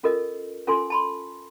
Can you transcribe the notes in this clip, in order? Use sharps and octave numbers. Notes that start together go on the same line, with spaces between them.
C#4 F4 A4 A#4 D#5
C#4 F4 A4 G#5 C6
A5 B5 C6